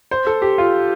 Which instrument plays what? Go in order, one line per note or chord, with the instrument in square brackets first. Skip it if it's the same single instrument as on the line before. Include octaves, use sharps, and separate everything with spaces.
[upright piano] C5
A4
G4
F4